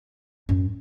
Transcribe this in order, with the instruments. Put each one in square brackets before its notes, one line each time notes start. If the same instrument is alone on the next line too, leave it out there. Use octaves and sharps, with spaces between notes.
[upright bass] F#2